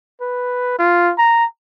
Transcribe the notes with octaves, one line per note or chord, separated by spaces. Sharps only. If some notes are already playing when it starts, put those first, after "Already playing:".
B4
F4
A#5